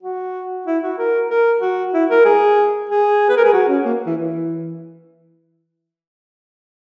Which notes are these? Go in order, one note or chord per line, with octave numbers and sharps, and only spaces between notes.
F#4
E4
F#4
A#4
A#4
F#4
E4
A#4
G#4
G#4
B4
A#4
G#4
F#4
C#4
A#3
E3
E3